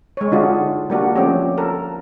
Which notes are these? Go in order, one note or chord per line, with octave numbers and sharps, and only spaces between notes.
G#3 C#5
D3 D4 D#4 F4 F#4 G#4
G3 A#3 D4 F#4
F3 A3 C4 C#4 G4
A4 A#4